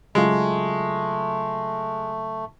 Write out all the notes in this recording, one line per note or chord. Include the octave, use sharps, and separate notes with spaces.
C#3 F#3 G#3 A3 F4